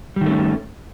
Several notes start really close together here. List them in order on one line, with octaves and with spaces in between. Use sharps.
G3 D#3 A3 C#4